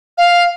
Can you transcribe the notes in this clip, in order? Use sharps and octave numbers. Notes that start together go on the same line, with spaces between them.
F5